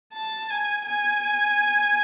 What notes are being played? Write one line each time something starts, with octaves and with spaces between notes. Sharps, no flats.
A5
G#5
G#5